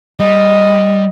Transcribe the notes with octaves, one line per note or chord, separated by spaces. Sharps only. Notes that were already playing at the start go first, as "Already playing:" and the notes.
G3 D#5